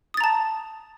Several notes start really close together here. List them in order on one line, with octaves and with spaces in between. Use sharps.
D#6 A6 A#5 A5